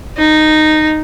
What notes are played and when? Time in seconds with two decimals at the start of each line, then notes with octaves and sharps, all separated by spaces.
0.18 D#4